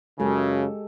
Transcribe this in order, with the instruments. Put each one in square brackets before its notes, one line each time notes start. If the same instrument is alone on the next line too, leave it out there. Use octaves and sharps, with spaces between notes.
[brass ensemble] F#2 C#3 [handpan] G#3 G4 A4